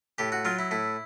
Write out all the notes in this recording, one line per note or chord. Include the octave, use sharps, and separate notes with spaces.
A2 G4
F#4
F#3 F4
E4
A2 E4